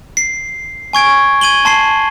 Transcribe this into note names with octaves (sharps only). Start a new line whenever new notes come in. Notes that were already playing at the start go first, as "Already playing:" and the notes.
C7
G#5 C#6 G#6 D7
G#6 D#7 F#7 G7
A5 C6 C7